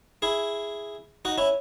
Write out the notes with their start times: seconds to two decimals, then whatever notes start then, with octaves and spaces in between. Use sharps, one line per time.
0.22 E4 G#4
1.25 D#4 F#4
1.38 C#4 E4